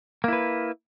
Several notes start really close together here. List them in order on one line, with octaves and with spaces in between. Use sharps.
A#3 E4 B4